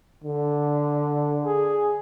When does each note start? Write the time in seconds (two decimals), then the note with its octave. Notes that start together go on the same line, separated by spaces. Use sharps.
0.24 D3
1.44 G#4